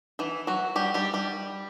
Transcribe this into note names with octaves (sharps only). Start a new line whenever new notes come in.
E3 E4
F#3 F#4
G3 G4
G3 G4
G3 G4